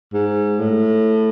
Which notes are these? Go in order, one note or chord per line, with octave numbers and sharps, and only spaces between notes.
G#2
A2